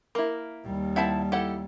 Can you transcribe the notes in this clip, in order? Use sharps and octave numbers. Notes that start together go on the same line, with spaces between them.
A#3 E4 A#4
D#2 G3
C4 E4 E5 F#5 A5
E4 G4 A4 F#5